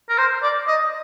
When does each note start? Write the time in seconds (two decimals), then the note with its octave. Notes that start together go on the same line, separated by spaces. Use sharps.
0.10 A#4
0.18 C5
0.43 D5
0.68 D#5